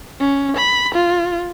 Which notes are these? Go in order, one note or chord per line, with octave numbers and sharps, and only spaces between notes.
C#4
B5
F4